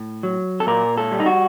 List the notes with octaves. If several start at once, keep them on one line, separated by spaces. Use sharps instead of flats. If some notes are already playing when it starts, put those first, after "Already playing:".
Already playing: A2
F#3
A4
A#2 A#4
A4
G3
D#4
F#4